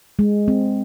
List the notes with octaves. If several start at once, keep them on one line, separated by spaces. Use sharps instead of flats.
G#3
C4